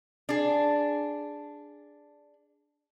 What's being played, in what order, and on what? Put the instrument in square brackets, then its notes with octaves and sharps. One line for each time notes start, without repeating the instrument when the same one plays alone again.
[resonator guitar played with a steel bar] D4 G#4